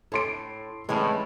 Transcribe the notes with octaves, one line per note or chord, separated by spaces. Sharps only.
A2 A4 C6 D7
A2 E3 G3 G#3 C#4